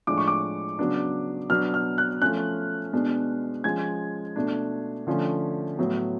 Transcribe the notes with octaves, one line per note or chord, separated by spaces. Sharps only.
A2 F3 G#3 D4 D6
C#6
D6
C#3 F#3 B3 D4
B2 F#3 B3 D4 F6
F6
F#6
F3 A3 C#4 F#6
B2 G#3 B3 D4
F3 G#3 C#4 G#6
B2 A3 D4
D3 F3 A3 C#4
A2 F#3 B3